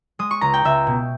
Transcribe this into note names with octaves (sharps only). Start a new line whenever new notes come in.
G#3 D#6
C#6
C#2 A#5
G5
C#2 E5
B2